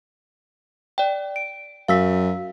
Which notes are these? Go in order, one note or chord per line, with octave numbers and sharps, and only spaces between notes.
D5 G5
D7
F#2 F5 E6 B6